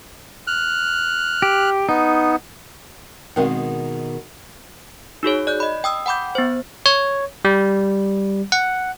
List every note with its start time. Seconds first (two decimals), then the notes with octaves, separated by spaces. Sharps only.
0.47 F6 F#6
1.42 G4
1.89 B3 D#4
3.36 B2 D#3 G#3 C4 A#4 G5
5.23 D#4 F#4 G#4 C#5
5.47 D5 F#6 G6
5.60 D#5 B5
5.84 G5 D#6 E6
6.06 F#5 G5 B5 D6 G6
6.35 B3 C5
6.86 C#5
7.45 G3
8.52 F#5